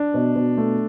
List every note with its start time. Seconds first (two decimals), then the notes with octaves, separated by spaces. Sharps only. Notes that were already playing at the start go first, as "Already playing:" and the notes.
Already playing: D4
0.14 B2
0.36 B2
0.58 A3